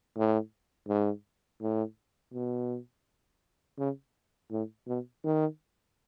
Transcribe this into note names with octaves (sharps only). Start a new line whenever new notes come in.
A2
G#2
A2
B2
C#3
A2
B2
D#3